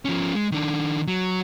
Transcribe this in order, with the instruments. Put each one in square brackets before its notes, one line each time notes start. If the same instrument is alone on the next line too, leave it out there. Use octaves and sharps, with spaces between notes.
[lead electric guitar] F3 C#4
G#3
D#3 D4
F#3